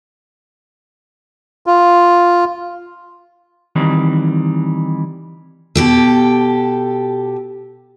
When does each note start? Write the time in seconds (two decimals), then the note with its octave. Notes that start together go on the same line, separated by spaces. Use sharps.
1.66 F4
3.76 D#3 E3 G3 C4
5.75 B2 G4 A4